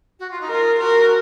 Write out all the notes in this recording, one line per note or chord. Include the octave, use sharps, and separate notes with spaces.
F#4
F4
D#4
F4 A#4
F#4 A#4